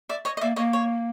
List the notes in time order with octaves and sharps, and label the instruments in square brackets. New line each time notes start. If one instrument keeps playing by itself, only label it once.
[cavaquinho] D5 E5
C#5 D#5
D#5
[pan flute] A#3 [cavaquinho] D5 E5
[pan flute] A#3 [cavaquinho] C#5 D#5
[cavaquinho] C#5